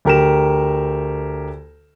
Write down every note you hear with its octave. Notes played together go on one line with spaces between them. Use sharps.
D2 G4 A#4 A#5 E7